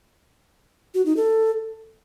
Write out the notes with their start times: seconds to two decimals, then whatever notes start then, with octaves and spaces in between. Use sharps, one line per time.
0.95 F#4
1.06 D#4
1.17 A4